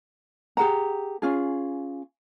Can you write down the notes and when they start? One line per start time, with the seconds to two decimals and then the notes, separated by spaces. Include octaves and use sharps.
0.57 G4 G#4 F#5 A#5
1.22 C#4 F4 G#4